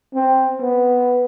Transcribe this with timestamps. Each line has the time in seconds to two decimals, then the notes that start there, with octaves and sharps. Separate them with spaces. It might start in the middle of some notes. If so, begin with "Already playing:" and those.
0.14 C4
0.61 B3